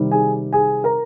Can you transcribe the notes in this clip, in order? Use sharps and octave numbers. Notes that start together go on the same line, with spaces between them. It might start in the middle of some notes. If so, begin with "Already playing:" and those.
Already playing: C3 D#3 G3
G#4 G#5
G#4 G#5
A#4 A#5